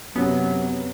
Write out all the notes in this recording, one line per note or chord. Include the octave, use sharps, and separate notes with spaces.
F#2 C3 F#3 B3